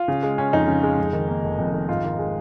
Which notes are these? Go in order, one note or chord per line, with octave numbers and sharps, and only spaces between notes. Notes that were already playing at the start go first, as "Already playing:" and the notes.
Already playing: F4
C#3
G#3
C#4
F2 D#4
C#3
G#3
F2
D#3
A#3
F1
F2
D#3
G#2 F4
D#3
G#3